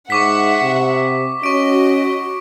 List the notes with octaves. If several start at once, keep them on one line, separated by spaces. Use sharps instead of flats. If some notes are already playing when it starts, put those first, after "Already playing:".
G#2 E5 F#5 C#6 D6 B6
C3
C#4 F#4 D#5 C#6 D7